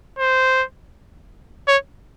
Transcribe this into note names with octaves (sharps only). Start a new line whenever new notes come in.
C5
C#5